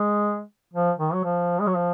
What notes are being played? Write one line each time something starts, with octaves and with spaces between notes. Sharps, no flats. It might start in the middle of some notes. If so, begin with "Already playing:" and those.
Already playing: G#3
F3
D#3
F#3
F3
G#3
F#3
F3